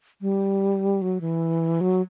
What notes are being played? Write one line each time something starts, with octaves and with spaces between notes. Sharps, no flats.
G3
F#3
E3
F#3